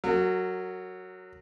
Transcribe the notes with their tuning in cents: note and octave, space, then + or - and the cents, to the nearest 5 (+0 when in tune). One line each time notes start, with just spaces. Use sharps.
F#3 +0 A#4 -35